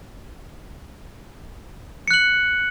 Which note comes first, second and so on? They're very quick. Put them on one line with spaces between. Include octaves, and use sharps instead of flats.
C#7 F#6 F#7